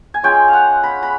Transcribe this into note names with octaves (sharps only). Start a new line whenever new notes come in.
G#5
G#3 C#4 F4 G5
F5
F#5
B5
B5